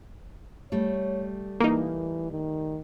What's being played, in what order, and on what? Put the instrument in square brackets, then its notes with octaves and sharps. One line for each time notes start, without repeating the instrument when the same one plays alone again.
[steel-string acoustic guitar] G3 A3 [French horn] C#5
[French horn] E3 [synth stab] A#3 D#4
[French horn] D#3